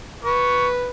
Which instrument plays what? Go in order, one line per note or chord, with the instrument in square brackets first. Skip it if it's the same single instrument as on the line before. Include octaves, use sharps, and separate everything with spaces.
[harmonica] B4 [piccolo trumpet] C#6